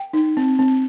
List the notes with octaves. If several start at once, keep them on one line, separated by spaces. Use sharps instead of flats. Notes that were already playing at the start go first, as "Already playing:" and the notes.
Already playing: G5
D#4
C4
C4